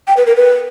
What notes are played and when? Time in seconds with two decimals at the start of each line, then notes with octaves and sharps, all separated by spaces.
0.07 G5
0.17 B4
0.26 A#4
0.36 B4